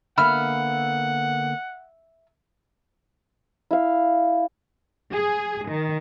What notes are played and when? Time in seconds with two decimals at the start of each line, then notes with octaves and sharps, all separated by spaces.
0.18 D3 A#3 B3 E5 F#5 B5 F6
3.71 E4 F5
5.11 G#4
5.67 D#3